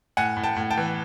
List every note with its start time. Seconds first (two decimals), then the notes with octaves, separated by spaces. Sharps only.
0.17 A2 F#5 G#5
0.37 A2
0.43 G5 A5
0.56 A2
0.70 G5 A5
0.77 E3